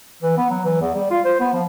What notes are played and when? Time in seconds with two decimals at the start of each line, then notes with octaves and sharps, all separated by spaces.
0.22 E3
0.37 B3
0.50 F#3
0.65 E3
0.81 E2
0.94 G3
1.11 F4
1.25 C5
1.40 B3
1.53 F3